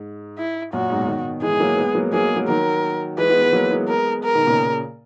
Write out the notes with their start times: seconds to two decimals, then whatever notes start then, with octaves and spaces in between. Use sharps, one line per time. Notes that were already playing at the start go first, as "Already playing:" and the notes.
Already playing: G#2
0.38 E4
0.73 F#2 A#2 F#4
0.90 G#2 B2
1.08 B2 D#3
1.42 E3 G#3 G#4
1.60 F#3 A#3
1.78 G#3 B3
1.95 F#3 A#3
2.12 F#3 A#3 G#4
2.25 G#3 B3
2.36 F#3 A#3
2.47 D#3 F#3 A#4
3.18 E3 G#3 B4
3.30 G#3 B3
3.41 G#3 B3
3.53 F#3 A#3
3.71 G#3 B3
3.88 A#4
4.23 A#4
4.35 B2 D#3
4.47 A#2 C#3